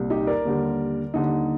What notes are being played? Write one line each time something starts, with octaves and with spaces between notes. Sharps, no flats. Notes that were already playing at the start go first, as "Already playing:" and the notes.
Already playing: C2 A#2 G3
D#4 G4
A#4 D5
D#2 D3 G3
D#2 D3 G3 D#4